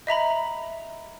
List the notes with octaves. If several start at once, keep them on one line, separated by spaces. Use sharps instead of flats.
D#5 E5 A#5 B5